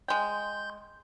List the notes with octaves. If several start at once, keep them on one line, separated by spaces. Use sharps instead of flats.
G#3 G5 C6 G6